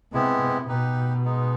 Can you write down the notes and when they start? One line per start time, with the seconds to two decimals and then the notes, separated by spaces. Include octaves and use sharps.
0.12 C3 G#3 B3 E4 G4
0.41 C3
0.68 B2 D#4 G4 B4
1.25 G#3 B3 D#4